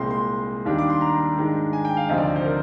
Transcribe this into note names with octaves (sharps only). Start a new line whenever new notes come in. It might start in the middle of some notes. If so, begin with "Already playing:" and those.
Already playing: C2 A#2 G#3 C4 C6
C6
D#2 D#3 G3 D4
D6
C6
A#5
G#2 D#3 G#3 D4
G#5
G5
F5
D2 C3 F3 C4 D#4 D#5
D5
C5
A#4